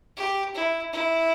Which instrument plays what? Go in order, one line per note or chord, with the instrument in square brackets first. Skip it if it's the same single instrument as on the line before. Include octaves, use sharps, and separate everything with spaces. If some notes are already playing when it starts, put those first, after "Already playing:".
[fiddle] G4
E4
E4